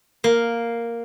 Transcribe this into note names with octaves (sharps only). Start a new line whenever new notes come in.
A#3